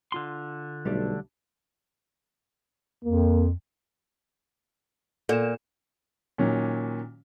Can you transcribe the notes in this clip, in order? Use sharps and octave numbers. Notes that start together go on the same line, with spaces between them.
D3 F4 C6
B1 G3 A3 D4
F2 A#3
A#2 A4 E7
A#2 D#3 F#3 A#3 C#4